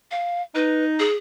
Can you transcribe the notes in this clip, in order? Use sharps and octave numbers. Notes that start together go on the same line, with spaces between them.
F5
D#4 B4
G#4